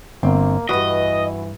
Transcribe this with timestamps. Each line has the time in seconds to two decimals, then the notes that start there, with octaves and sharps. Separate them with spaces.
0.23 G1 A#3 C4
0.69 D2 G2 E3 F#4 B4 D#5